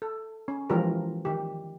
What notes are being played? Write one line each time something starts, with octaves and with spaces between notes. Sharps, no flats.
A4
C#4
E3 F3 G#3 F4 G4 A#4
D#3 G4